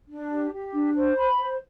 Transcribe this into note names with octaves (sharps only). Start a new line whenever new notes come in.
D4
G4
G4
D4
C5
B5
C5